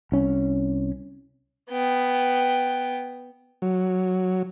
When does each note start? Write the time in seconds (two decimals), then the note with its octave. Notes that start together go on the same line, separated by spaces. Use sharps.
0.12 C2 C#4
1.69 B3 G5
3.62 F#3